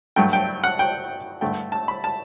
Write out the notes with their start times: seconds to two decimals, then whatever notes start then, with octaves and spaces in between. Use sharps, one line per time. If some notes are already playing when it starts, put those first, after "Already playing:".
0.16 G2 F#3 A3 G5
0.33 G5
0.64 F#5
0.79 G5
1.41 G2 D3 A3 G5
1.72 A5
1.88 B5
2.04 A5